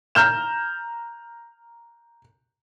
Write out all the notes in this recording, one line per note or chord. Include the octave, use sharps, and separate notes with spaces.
A#5 F6 G6 E7